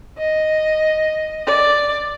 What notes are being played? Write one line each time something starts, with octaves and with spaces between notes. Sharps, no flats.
D#5
D5